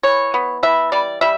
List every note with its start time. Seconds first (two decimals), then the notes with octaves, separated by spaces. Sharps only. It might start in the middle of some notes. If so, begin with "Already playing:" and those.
0.03 E3 C#5
0.34 B3
0.63 E3 E5
0.92 G3 D5
1.21 G3 E5